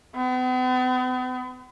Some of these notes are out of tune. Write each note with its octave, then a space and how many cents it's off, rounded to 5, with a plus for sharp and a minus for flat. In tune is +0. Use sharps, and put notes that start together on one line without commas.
B3 +45